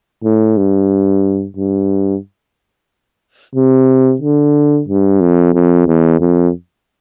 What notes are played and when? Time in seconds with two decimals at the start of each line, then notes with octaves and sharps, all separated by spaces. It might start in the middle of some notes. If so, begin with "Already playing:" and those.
0.24 A2
0.57 G2
1.57 G2
3.56 C3
4.22 D3
4.88 G2
5.21 F2
5.54 F2
5.87 E2
6.21 F2